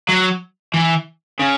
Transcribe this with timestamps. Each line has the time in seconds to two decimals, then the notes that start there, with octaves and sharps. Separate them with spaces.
0.09 F#3
0.74 E3
1.40 C#3